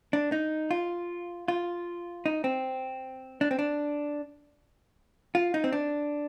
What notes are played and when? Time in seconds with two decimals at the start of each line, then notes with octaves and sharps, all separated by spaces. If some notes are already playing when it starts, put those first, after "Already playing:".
0.13 D4
0.32 D#4
0.71 F4
1.48 F4
2.26 D#4
2.44 C4
3.41 D4
3.51 C4
3.59 D4
5.35 F4
5.54 D#4
5.64 C4
5.73 D4